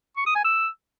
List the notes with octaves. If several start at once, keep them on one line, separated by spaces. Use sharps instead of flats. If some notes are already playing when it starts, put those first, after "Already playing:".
C#6
D#6
G#5
E6